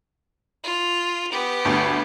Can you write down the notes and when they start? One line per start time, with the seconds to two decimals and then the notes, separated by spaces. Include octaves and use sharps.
0.64 F4
1.31 B3 G4
1.65 G1 D2